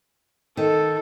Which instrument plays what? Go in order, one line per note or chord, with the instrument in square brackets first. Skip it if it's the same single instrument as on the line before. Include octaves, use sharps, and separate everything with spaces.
[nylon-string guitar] D#3 [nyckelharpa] A4